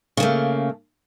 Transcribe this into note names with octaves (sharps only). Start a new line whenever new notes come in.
C#3 A3 A#3